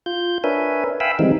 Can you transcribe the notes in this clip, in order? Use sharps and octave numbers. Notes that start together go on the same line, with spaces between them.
F4 G6
D4 A#4 B4 C#5 E5 G#5
E5 F5 G5 G#5 B5 E6
D#3 E3 G3 G#3 C4 D#4